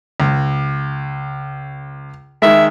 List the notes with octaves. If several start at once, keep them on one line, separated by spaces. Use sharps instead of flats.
C#2
D#3 G#3 E5